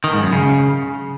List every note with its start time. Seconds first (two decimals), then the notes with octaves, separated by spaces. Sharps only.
0.04 D#3
0.14 G#2
0.23 F#2
0.33 C#3